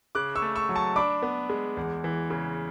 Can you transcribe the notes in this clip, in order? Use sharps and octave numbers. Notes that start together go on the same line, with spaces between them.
C#3 D6 F#6
C#6 E6
A3
C#6 E6
F#3
A5 C#6
D4 B5 D6
B3
G#3
E2
E3
C#3